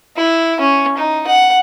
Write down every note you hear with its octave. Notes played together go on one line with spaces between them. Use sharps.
E4
C#4
D#4
F#5